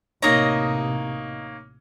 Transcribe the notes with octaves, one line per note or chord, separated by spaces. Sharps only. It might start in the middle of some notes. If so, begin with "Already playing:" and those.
A1 C3 A#3 D#4 C#5 D#5 A#5